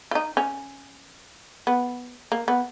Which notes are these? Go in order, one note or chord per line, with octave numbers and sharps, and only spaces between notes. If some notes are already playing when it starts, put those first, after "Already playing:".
F4
D#4
C#4
B3
A#3
B3